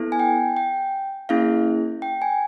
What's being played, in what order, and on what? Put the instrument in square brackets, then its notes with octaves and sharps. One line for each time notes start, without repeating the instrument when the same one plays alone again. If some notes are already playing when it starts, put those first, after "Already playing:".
Already playing: [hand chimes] B3 E4 A4
G#5
G5
G5
A#3 C#4 E4 G#4 F5
G5
G#5